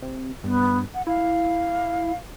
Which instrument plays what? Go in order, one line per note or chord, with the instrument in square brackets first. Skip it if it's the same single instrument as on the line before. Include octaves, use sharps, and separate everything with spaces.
[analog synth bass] C3
[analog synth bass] G2 [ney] B3
[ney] F#5
[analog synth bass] E4 [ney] F5